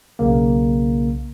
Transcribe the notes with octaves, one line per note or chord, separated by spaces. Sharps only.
B1 C#3 A#3